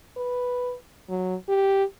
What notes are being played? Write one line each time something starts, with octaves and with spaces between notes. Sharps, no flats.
B4
F#3
G4